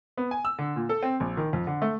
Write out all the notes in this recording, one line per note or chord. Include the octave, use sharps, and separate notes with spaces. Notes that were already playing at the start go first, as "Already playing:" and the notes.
B3
G#5
E6
D3
A#2
A4
C4
A#1
D#3
F2
D3
A3